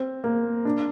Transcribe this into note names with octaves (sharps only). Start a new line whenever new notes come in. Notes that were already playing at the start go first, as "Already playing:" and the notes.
Already playing: C4
A#3
D4